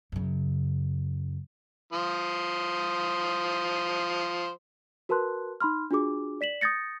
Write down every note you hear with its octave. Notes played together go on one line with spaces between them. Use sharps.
F#2 C#3
F3 C5 D#6
F#4 A#4 B4 A5 C6 F#6
D#4 B5 C6 F6
D4 F4 F#4 G#4 D6
D5 B6 E7 F#7
D#6 G6 A6 A#6 C#7